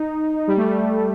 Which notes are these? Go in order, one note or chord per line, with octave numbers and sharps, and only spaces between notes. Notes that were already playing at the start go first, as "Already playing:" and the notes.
Already playing: D#4
G3
A3
G3